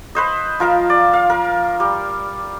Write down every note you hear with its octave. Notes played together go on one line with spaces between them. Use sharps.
B4 C5 D#5
F3 A#4 F5 A#5
D5
F5
A#4
G3